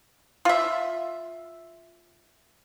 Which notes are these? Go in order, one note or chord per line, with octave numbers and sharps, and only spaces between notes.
F4 E5